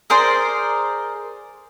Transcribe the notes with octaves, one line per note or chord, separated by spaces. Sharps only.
G#4 A#4 C5 D5